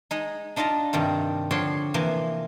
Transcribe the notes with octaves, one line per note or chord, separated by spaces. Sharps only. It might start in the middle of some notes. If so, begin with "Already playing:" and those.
G#3 D#4
D4 D#4 F4 A5 A#5
G2 C3 D#3 G3
D3 F3 C4 C#5 C6
C3 E3 F3 A#3